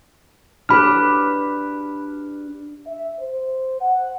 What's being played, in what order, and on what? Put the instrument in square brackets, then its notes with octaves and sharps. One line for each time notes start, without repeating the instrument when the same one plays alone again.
[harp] D4 G4 B4 [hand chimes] B5 F6
[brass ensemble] E5
C5
F#5